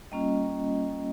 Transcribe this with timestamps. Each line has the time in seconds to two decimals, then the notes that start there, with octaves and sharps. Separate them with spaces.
0.12 G3 A#3 C#4 F4 D#5